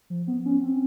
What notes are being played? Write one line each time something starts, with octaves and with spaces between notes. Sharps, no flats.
F3
B3
C#4
C4